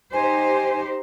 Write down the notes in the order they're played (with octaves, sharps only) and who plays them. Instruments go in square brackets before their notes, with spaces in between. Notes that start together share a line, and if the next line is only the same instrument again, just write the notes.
[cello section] D#4 G4 C5 [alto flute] G#5